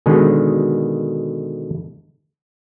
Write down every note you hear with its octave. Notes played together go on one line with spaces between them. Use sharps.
B2 D3 D#3 G#3 D#5